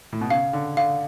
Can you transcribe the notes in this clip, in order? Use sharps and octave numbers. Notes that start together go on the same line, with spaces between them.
A2
B2
C#3 F5
D3
D3 F5